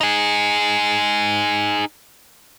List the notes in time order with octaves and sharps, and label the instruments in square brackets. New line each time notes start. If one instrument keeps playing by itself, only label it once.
[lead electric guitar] D#4 G#4